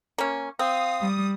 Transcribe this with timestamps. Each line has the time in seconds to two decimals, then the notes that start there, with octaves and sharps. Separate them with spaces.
0.18 A#3 C#4
0.59 C4 F5 D#6
1.02 G3